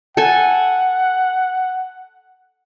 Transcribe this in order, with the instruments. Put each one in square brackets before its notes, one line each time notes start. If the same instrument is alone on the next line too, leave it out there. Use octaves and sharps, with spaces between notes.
[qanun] A4 G#5 [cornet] F#5